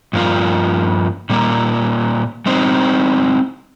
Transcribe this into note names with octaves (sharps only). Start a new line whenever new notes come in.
G2 F3 A#3 F4
A#2 G3 A#3
G3 C4 D#4 C5